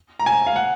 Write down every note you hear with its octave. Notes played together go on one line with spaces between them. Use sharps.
A#5
G#5
F5
F#5